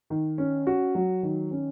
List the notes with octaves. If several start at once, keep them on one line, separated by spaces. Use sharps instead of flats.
D#3
C#4
F#4
F#3
D#3
C#4